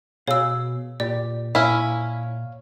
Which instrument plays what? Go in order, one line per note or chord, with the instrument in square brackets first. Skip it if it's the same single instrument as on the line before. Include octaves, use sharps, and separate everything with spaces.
[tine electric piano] B2 [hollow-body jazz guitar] G#4 F5 [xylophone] C#5 E6
[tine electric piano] A#2 [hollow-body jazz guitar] G4 [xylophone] D5
[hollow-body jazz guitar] A#2 [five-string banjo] C#4 E4 [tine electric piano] C#5 F5